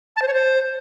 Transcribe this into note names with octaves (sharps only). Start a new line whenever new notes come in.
A5
C5
C#5
C5